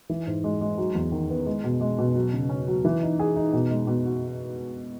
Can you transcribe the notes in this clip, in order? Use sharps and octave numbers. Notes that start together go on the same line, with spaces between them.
E3
G#2
G#3
G#3
F#3
E2
D#3
B3
G#3
B2
G#3
B2
F#3
C#3
C#4
F#3
E3
D#4
G#4
D#4
B2
G#3
B2
F#4